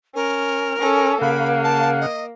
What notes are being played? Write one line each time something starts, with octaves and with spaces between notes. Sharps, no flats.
C#4 A#4
C#4 A4
C#3 A#3 F5 F#5 B5
A5
D#5